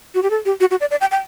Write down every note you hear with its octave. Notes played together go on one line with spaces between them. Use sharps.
F#4
G4
A4
G4
F#4
F#4
D5
D5
G5
G5